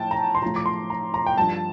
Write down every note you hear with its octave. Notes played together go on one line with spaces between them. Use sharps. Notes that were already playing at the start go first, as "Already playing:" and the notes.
Already playing: A2 F3 G5 A5
A#5
C6
A2 F3 A#5
D6
C6
A#5
A#5
G5
G2 F3 A5